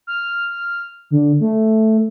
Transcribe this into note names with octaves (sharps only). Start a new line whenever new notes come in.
F6
D3
A3